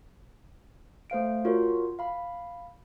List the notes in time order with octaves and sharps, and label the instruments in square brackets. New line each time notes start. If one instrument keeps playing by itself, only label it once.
[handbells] A3 C5 F5 D7
F4 F#4 A#4 C#5
F5 B5